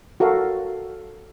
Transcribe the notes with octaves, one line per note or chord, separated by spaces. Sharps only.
F#4 A4 A#4 F5